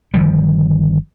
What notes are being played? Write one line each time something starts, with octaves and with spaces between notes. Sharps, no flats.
G1 D#3 F3 G3